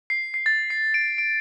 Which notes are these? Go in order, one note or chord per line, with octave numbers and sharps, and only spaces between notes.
C7
C7
A6
C7
D7
D7